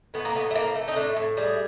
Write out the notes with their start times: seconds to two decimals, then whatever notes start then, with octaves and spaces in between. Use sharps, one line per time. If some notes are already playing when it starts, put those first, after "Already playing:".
0.14 A2 B3
0.25 A#3
0.35 A2 B3
0.51 A3
0.55 E3 A#3
0.75 A3
0.88 D#4
0.96 A2 D4
1.16 A2
1.37 G3 G#4